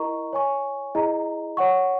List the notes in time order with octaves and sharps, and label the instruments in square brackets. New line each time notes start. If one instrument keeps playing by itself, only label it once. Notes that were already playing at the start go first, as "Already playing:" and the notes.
Already playing: [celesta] E4 A#4 D#5 A#5 C#6
C#5 G#5 C#6
E4 G#4 D#5 A#5
C#5 F#5 C#6